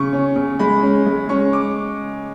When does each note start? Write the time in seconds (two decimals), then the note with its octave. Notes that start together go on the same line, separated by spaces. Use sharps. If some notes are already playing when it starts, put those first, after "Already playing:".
Already playing: C#3 C#6
0.13 C#4
0.36 C#3
0.59 G#3 B5
0.82 C#4
1.06 G#3
1.29 C#4 C#6
1.53 D6